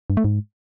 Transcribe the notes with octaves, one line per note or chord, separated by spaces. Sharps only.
G2
A3
G#2